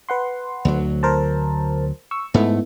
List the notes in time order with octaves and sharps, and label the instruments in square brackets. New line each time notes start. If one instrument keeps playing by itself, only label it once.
[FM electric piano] B4 F#5 C6
[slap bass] D2 F#3
[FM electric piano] A#4 C5 A5
C#6 E6
[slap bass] G#2 A3 [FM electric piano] B3 E4 A4